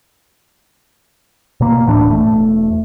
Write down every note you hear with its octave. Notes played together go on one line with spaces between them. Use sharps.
B2 A#3
D1 A2 E3 D4
E1 A3